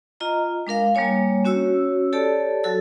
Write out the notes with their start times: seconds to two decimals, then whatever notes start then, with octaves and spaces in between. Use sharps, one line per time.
0.20 F4 D#5 A#5
0.67 G#3 D4 A#4 F5
0.95 G3 A#3 D4 C#5 G#5
1.45 C#4 F#4 C#5 E6
2.13 G4 A4 C#5 D5 A5
2.64 F#3 F#4 A4 E6